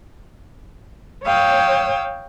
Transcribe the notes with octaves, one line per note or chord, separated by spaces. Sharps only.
C#5 F5 G5 D#6 E6